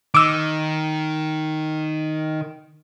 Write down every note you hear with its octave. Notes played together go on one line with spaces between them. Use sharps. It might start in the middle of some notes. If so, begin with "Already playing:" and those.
D#3 D6 E6